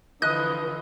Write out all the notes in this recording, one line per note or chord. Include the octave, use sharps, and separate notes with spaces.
D3 E3 F3 D#5 D#6 F#6